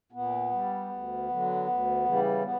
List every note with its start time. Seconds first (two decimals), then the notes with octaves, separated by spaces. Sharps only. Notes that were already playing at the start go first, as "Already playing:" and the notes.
0.12 A#2 B3
0.51 G3
0.90 D2
1.28 D3 F#3
1.67 D2
2.04 C#3 E3 G3
2.43 B3